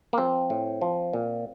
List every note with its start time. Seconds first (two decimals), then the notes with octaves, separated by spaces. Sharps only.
0.13 A#3
0.18 F3 C4
0.50 A2
0.81 F3
1.13 A#2